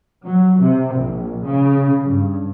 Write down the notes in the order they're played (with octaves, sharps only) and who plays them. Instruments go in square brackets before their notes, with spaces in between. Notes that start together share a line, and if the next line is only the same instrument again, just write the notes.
[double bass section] F#3
C3
A#1
C#3
G2